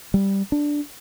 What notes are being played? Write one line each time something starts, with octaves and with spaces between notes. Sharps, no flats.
G3
D4